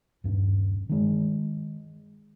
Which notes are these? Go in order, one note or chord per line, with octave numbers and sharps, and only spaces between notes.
D#1 G2
D#3 G#3